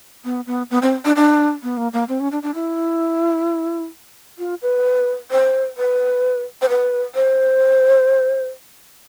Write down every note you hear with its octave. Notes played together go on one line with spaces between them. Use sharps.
B3
B3
B3
C4
D4
D4
B3
A#3
A#3
C4
C#4
D4
D4
E4
F4
B4
C5
B4
C5
B4
C5